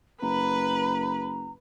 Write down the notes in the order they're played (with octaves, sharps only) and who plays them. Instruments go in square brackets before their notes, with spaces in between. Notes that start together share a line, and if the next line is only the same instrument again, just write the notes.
[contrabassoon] F#1 [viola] B4 B5 [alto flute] A#5